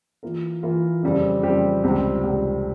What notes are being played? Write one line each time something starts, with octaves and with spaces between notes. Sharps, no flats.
E3 A#3 F4 A#4
E3 A#3 F4 A#4
F2 C#3 G3 C4 G4
F2 C#3 G3 C4 G4
C#2 C3 G3 C4 G4
C#2 C3 G3 C4 G4